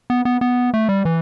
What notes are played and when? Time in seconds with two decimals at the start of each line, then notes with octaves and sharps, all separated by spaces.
0.10 B3
0.25 B3
0.41 B3
0.74 A3
0.89 G3
1.05 E3